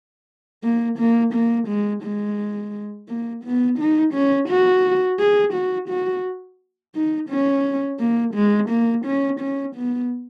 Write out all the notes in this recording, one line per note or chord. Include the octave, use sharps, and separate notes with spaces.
A#3
A#3
A#3
G#3
G#3
A#3
B3
D#4
C#4
F#4
G#4
F#4
F#4
D#4
C#4
A#3
G#3
A#3
C#4
C#4
B3